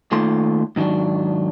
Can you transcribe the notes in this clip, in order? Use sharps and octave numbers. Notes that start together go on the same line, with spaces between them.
D#2 D#3 A3 F4 C6
G#2 D#3 F3 F#3 D4